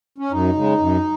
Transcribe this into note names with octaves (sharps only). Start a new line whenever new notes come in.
C#4
F#2 D#4
C#3 G#3
F#2